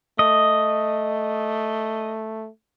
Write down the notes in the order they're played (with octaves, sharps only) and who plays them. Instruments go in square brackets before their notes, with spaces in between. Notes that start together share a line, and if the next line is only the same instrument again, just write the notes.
[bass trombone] A3 [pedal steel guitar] D#5